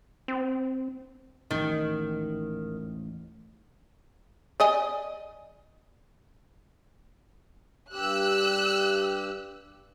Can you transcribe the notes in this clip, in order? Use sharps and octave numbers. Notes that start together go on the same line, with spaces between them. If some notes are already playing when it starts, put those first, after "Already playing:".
C4
A1 D#2 G#2 D#3
D5 D#5 G#5
G2 G4 E6 F#6